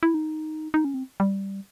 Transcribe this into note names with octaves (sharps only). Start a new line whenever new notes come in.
E4
D#4
D#4
C#4
C4
G3